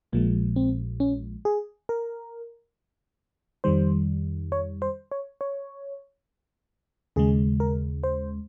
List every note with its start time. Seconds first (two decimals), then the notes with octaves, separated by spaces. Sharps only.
0.12 A#1 A#2 F3 G#3 A#3
0.56 C4
1.00 C#4
1.45 G#4
1.89 A#4
3.64 F2 D#3 G3 C5
4.52 C#5
4.82 C5
5.12 C#5
5.41 C#5
7.16 D#2 C#3 G#3 G#4
7.60 A#4
8.03 C5